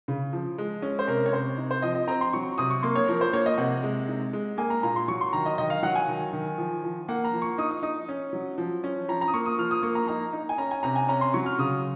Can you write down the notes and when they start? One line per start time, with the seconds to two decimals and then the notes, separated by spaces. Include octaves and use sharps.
0.08 C#3
0.33 F3
0.58 G#3
0.82 C#4
0.99 C5
1.08 C3 A#4
1.26 C#5
1.33 C3 C5
1.57 D#4
1.71 C5
1.82 F3 D#5
1.95 D#5
2.07 C4 A#5
2.21 C6
2.33 F#3 C#6
2.58 C3 D#6
2.71 C#6
2.82 A#3 C6
2.96 C#5
3.08 F3 A#4
3.21 C5
3.33 A#3 C#5
3.46 D#5
3.58 C3 F#5
3.83 G#3
4.08 D#4
4.33 G#3
4.58 A#3 G#5
4.70 A#5
4.83 A#2 A#5
4.96 C6
5.08 F#3 C#6
5.21 C6
5.33 D#3 A#5
5.46 D#5
5.58 D#3 D#5
5.70 F5
5.83 F#3 F#5
5.95 G#5
6.08 D#3
6.33 D#3
6.58 F3
6.84 F3
7.08 A#3 F#5
7.24 A#5
7.33 F3
7.42 C#6
7.58 D#4 D#6
7.71 D#6
7.83 D#4 D#6
8.09 C#4
8.33 F#3
8.58 F3
8.84 C#4
9.08 F3 A#5
9.21 A#5
9.28 D#6
9.34 A#3 C#6
9.46 D#6
9.58 F3 F6
9.71 D#6
9.83 A#3 C#6
9.95 A#5
10.08 D#4 A#5
10.33 D#4
10.49 G#5
10.58 C#4 A#5
10.71 G#5
10.83 C3 A#5
10.96 G#5
11.08 C#4 A#5
11.21 C6
11.34 F#3 C#6
11.46 F6
11.59 C#3 D#6